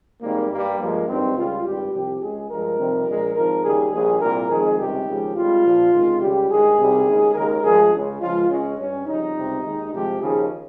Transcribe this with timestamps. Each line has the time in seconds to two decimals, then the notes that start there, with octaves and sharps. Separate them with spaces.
0.22 G#1 G#2 G3 A#3
0.51 G2 G3 A#3
0.79 G2 F3 G#3 A#3
1.08 G#1 G2 D#3 G3 C4
1.36 C#2 C#3 G3 F4
1.65 G#1 G2 G3 G4
1.93 C2 C3 F3 G4
2.22 C#2 C#3 G#3 G#4
2.50 G2 F3 G#3 A#4
2.78 F2 C3 D#3 G3
3.07 A#1 A#2 G#3
3.35 G#1 G#2 F3 A#4
3.64 D#2 C#3 G3 G#4
3.93 A#1 A#2 G3 G#4
4.22 C2 A#2 G3 A#4
4.50 F2 D#3 G#3 G#4
4.78 C#2 C3 D#3 G3 G4
5.07 D#2 C#3 F3 G#3
5.36 G#1 G#2 G3 F4
5.65 A#1 A#2 F3
5.92 C#2 C3 D#3 G#3
6.20 C#2 C#3 G3 G4
6.49 G2 D#3 G#3 G#4
6.78 C2 C3 D#3 G3
7.06 D#2 C#3 G#3
7.35 D#2 C#3 G#3 A#4
7.64 G2 F3 G#3 G#4
7.92 C#2 C#3 G#3
8.20 C#2 C#3 F3 G#3 F4
8.49 C#2 C#3 G#3 C#4
8.78 G2 G3 C#4
9.06 F2 C#3 G3 D#4
9.35 C#2 C3 G3
9.64 D#2 D#3 G#3
9.92 C2 C3 F3 G#3 G4
10.20 D#2 C#3 F3 G#4